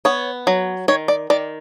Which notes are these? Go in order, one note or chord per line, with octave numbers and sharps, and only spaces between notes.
B3 C#5
F#3
D#3 C#5
D5
D#3 D5